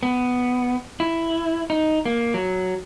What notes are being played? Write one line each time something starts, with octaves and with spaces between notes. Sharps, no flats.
B3
E4
D#4
A#3
F#3